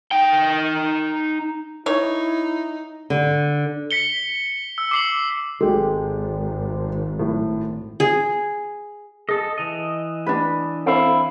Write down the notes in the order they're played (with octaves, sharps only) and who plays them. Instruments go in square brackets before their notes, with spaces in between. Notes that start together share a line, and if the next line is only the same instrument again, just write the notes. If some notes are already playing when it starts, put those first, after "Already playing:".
[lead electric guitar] D#4 G5
[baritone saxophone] D#4 [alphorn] E4 [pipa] C#5
[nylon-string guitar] D3
[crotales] B6 C#7 G7
E6
D6 C7 F#7
[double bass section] G#1 [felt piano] G#3 G4 [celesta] F#4 A4
[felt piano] A2
[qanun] G#4
[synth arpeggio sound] G#4 [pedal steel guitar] A4 D#5
[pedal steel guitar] E3 D#5
[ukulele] D4 B4
[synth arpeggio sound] C4 A4 C5 [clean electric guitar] E4 F5